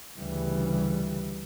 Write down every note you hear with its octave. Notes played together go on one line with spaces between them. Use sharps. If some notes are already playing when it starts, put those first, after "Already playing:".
D2 C#3 E3 G3